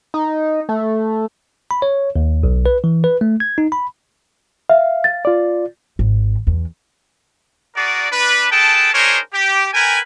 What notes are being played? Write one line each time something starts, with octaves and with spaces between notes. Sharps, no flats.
D#4
A3
B5
C#5
D#2
B1
B4
E3
B4
A3
G#6
D#4
B5
E5 F5
A6
F4 D5
G#1
E2
F#4 G#4 A#4 D5
D4 B4
G#4 A4 B4 G5 A5
D4 D#4 G#4 A#4 C5 C#5
G4
A#4 B4 G5 G#5